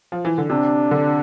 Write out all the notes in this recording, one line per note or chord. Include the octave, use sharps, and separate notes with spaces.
F3
E3
D3
C3 D4
D3